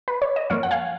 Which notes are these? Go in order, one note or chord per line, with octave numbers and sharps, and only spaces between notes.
B4
C#5
D#5
F#2 F3 A#3 C#5 F5
F#5
F5 G#5